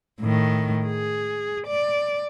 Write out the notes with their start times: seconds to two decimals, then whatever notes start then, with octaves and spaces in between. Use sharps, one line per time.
0.21 A2 D#3
0.86 G#4
1.67 D5